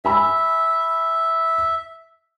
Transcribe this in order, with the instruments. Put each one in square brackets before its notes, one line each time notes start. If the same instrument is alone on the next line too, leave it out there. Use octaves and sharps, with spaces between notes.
[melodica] E5 [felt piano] G#5 B5 E6